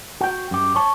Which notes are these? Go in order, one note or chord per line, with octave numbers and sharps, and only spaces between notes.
F#4 G5
F#2 G4
C#5 A5